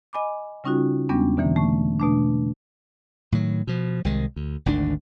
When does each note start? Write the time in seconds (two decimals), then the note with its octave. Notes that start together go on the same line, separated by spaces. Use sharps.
0.13 D#5 G#5 B5 D6
0.64 C#3 G3 C#4 D#4 F4 F#4
1.09 E2 G3 G#3 B3 C#4 D4
1.37 B2 D3 E3 A#3
1.56 A3 C#6
2.00 B2 A3 D4
3.32 A2 D#3 F#3
3.67 B2 F3
4.05 C2 C3 D#3 G#3
4.36 D2
4.66 G#1 D2 D#3 D4